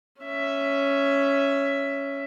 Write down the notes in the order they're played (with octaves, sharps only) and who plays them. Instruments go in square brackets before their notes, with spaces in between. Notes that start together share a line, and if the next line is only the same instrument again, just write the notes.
[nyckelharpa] C#4 E5